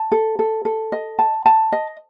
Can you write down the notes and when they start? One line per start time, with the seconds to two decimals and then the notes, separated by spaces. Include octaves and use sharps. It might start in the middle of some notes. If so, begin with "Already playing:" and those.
Already playing: A5
0.12 A4
0.39 A4
0.65 A4
0.92 D#5
1.19 A5
1.46 A5
1.72 D#5